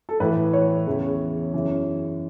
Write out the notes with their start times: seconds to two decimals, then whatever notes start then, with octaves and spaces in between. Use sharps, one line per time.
0.09 A4
0.20 A2 E3 B4
0.53 C#5
0.87 E2 C#3 E3
1.53 F#2 C#3 E3